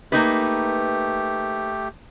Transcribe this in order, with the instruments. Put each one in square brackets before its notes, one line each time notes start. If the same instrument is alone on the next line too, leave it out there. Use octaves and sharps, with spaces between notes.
[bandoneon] A3 G4 [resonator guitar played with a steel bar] A#3 D#4 B4